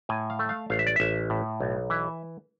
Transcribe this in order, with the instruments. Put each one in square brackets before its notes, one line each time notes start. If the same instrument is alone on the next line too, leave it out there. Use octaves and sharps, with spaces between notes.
[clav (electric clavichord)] A2 G#5
F5
A3
F5
A1 F5
E5
D5
A1 E5
A2
B1
E3 E5